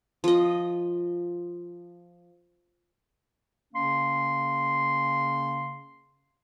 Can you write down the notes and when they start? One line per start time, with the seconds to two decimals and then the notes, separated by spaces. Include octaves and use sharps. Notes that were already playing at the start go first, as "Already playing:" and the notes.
0.24 F3 D#5
3.74 C#3 A#3 C#4 C6